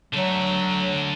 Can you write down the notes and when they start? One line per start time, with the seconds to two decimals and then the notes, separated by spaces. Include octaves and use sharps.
0.13 D3 F#3 A3